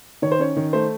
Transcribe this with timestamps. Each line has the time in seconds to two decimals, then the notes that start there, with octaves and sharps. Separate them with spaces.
0.22 D#3 C#5
0.32 C5
0.39 C#4 C#5
0.56 D#3
0.73 A3 C5